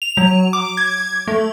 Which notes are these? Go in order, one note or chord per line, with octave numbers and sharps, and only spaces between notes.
F7
F#3
D6
G#6
A3